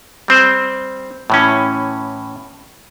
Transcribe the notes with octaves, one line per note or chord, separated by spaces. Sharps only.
G3 C4 C5
A2 E3 C#4